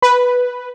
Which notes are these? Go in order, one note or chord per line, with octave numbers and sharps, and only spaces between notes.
B4